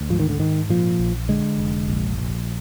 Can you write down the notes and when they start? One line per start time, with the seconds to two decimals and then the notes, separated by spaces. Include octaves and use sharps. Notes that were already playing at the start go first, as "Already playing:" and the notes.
Already playing: D2
0.10 G#2 F3
0.20 D#3
0.29 D3
0.39 G#2 D#3
0.69 A#2 F3
0.99 A#1
1.29 D3 G#3
1.58 F1
1.88 A#1
2.18 A#1